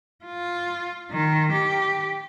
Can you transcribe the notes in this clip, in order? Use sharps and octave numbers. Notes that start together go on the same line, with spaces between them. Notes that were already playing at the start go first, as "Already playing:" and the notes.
F4
D#3
G4